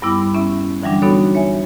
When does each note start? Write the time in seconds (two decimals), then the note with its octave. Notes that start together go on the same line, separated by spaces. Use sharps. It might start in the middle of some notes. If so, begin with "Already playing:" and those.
0.02 G2 G3 B3 E4 D6
0.34 B3 C#4 E4 E5
0.82 D3 E3 F#3 G3 D4
1.02 B3 D4 D#4 F#4 A4 C#5
1.35 C#5 E5 G#5